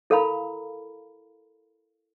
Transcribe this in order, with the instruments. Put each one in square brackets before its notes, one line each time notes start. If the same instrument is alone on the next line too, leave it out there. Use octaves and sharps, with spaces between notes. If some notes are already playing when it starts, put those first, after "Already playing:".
[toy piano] E4 A4 A#4 F5 A#5 B5